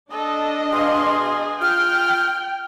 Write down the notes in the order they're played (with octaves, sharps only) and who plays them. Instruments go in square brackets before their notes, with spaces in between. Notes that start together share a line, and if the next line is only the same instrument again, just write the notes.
[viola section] D4 D#5 [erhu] A4
[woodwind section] B2 F5 C6 [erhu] G#4
[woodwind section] F4 F6 [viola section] G5